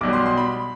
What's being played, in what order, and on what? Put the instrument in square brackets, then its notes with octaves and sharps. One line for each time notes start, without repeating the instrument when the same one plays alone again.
[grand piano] B1 B2 G3 D6
C6
C6
B5